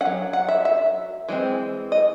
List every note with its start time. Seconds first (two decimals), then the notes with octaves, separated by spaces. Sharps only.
0.01 F#3 C#4 F#5
0.33 F#5
0.49 E5
0.65 E5
1.29 E3 G#3 C4
1.92 D#5